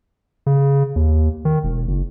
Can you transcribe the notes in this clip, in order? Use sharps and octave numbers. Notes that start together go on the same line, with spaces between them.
C#3
D#2
D#3
E1
F#1